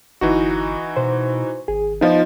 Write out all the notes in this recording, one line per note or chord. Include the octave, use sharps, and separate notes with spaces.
G1 E3 D#4 F#4
B2 C5
G#1 G#4
F3 B3 D#4 F4 D#5